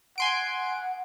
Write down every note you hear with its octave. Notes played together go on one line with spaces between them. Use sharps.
F#5 G#5 C6 D7